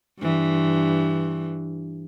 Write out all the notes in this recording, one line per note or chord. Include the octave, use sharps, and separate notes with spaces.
G2 E3